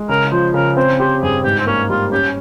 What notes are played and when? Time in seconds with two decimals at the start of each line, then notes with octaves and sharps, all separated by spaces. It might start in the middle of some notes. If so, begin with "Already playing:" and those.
Already playing: G#3
0.09 C#3 A#4
0.32 F3 C5
0.54 C#3 A#4
0.77 C4 C5
1.00 G4 C5
1.22 G2 G#4
1.44 G#2 G4
1.60 C4
1.66 A#3 C#4
1.89 G3 F4
2.12 C#4 G4